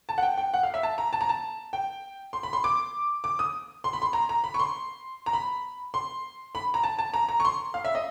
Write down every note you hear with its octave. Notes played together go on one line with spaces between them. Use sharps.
A5
F#5
G5
G5
F#5
F5
E5
A5
A#5
A5
A#5
A5
G5
C6
B5
C6
D6
D6
D#6
C6
B5
C6
A#5
A#5
B5
C#6
C6
A#5
B5
C6
B5
A#5
A5
A5
A#5
A#5
C#6
C6
F5
E5
D#5